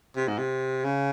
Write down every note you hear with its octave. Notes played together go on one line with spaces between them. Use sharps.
C3
G#2
C3
C#3